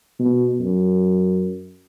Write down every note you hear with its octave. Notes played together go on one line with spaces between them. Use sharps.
B2
F#2